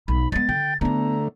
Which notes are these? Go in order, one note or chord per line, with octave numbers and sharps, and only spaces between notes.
B1 B5
G#3 B3 A6
D3 G5
D3 A3 B3 E4 A#5